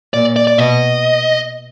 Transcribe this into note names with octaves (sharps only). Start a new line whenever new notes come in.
A#2 D5
D5
D5
B2 D#5